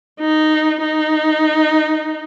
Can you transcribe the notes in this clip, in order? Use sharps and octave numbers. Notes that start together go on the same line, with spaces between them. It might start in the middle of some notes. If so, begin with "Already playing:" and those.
D#4
D#4